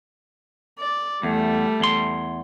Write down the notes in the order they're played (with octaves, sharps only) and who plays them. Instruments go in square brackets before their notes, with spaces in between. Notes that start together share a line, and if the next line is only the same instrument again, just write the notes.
[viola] D5
[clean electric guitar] E2 [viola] G3 A3
[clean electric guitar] E2 C6